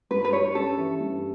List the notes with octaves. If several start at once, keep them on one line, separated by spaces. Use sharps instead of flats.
G2 B4
B4
G3 C#5
C#4 A4
E3
G2